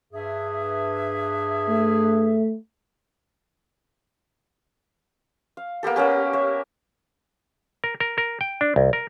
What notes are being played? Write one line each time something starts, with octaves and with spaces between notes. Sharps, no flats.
G2 G#4 E5
A3
F5
A#3 B3 G4 A4
A#3 B3 C#4 G4
C#5 E5
A#4
A#4
A#4
G5
D4
C2
A#4